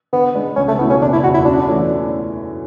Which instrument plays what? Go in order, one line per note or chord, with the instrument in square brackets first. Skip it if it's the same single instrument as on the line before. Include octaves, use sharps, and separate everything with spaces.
[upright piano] D3 [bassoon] B3
[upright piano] G#3 D4
[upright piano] C#2 [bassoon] C#4
[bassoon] A3
[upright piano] B2 A3 E4 [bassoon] B3
[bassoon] C#4
[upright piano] F#1 [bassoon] D4
[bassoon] E4
[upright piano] E2 B2 [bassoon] F#4
[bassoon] E4
[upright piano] F#2 [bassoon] D4
[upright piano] E3 A3 C#4